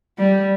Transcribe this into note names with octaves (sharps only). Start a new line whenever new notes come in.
G3